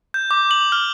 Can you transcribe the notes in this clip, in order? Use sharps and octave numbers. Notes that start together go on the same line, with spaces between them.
G6
D6
F#7
F6